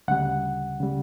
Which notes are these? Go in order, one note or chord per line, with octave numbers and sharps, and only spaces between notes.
D2 C#3 G3 F#5
C#3 G3